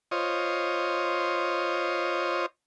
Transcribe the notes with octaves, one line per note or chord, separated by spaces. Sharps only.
F4 C5 C#5 D#5